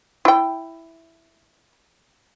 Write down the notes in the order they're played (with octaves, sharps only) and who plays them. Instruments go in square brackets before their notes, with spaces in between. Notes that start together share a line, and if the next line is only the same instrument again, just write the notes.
[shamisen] E4 G5